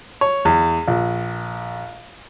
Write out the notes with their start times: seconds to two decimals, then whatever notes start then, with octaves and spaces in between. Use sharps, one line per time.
0.21 C#5
0.45 E2
0.88 A#1